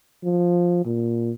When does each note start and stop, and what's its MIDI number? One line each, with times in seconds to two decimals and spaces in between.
0.24 0.85 53
0.86 1.31 46